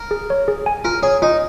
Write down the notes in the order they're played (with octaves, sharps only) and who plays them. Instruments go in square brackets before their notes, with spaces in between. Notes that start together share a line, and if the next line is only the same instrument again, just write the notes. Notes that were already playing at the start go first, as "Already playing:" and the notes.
Already playing: [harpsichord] A#4
[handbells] G#4
C#5
G#4
G#5
[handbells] F4 [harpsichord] A#4
[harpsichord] G#4 [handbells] C#5
[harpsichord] D#4 [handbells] F4